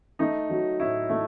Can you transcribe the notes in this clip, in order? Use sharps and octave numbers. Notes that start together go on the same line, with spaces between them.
A3 D#4
F#3
A2 E4
A3